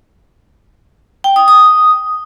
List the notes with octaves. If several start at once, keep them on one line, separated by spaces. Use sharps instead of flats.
G5
D#6
D#6